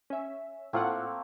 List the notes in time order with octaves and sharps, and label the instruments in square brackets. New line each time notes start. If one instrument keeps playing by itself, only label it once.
[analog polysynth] C#4 E5
[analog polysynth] A2 F4 F#5 [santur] A3 A#3 C4